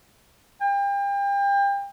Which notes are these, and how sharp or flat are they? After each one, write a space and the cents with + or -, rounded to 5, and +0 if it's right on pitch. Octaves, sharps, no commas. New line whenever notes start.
G5 +35